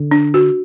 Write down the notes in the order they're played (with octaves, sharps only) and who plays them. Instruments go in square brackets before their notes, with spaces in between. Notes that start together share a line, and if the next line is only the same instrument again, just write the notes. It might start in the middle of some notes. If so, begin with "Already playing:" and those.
Already playing: [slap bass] D3
[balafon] D4
F#4